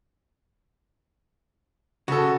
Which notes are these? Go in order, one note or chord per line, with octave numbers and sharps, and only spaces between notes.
C#3 F#4 A4